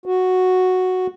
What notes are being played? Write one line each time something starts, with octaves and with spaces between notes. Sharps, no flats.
F#4